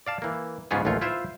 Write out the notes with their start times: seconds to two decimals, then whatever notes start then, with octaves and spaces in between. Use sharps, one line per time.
0.07 D5 F5 A5
0.22 E3 A#3
0.71 G#2 C#3 B3 C#4 F4 G#4
0.85 A1 D#2 A3 F4 C#5
1.01 E4 F4 C5 E5